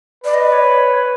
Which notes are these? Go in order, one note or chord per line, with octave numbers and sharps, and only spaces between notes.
B4 D5
D#5
D5
C#5